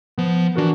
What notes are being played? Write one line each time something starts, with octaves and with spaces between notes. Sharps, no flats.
F3 B3
E3 D4 F#4 A#4